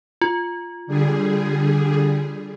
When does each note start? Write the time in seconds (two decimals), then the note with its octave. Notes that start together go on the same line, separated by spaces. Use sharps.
0.21 F4
0.87 D3 G3 G#4